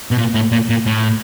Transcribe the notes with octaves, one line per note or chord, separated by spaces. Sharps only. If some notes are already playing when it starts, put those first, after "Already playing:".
B2
A#2
A2
A#2
A#2
A2